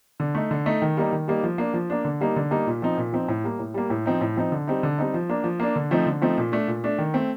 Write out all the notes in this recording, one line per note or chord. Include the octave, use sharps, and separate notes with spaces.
D3
A3 D#4
D3
A3 D#4
D#3
G3 A#3 D#4
D#3
G3 A#3 D#4
F3
A#3 D4
F3
A#3 D4
D3
G3 A#3 D#4
D3
G3 A#3 D#4
A#2
F3 C4 D#4
A#2
F3 C4 D#4
A2
G3 A#3
A2
G3 A#3
A2
F3 C4 D#4
A2
F3 C4 D#4
D3
G3 C4 D#4
D3
G3 C4 D#4
F3
A#3 D4
F3
A#3 D4
D3
F3 A3 C4 D#4
D3
F3 A3 C4 D#4
A#2
A3 D4
A#2
A3 D4
D#3
A3 C4